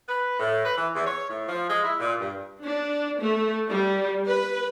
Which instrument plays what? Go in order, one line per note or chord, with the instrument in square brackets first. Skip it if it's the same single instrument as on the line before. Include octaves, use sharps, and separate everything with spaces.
[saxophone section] B4
A2
B4
E3
E2
C#5
A2
F3
G#3
E4
A#2
G2
[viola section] D4
A3
G3
B4